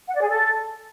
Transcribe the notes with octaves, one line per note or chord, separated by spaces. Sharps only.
F#5
D5
G#4
A4